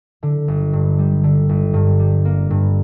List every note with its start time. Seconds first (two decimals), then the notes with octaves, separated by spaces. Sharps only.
0.23 D3
0.48 G1
0.73 G2
0.99 G3
1.24 D3
1.49 G1
1.74 G2
1.99 G3
2.25 A#3
2.50 G2